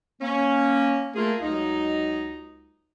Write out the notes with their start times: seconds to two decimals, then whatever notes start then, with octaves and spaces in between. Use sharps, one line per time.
0.21 A#3 C#4
1.15 A3 A#3 F4 G#4
1.42 C#2 F#3 D#4